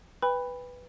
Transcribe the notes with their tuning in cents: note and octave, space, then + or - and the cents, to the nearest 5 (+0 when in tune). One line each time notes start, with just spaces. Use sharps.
B4 +0 G5 +35 B5 +0